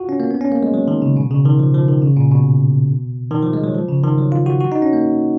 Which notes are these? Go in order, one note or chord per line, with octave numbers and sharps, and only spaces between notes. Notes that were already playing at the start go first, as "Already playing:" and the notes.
Already playing: F4 F#4
C#4
A#3
B3
C#4
A#3
G#3
F#3
D#3
C#3
B2
C#3
D#3
F3
F3
D#3
C#3
A#2
B2
D#3
F3
G#3
F#3
F3
C#3
D#3
F#3
F4
F#4
F#4
D#4
C#4
A#3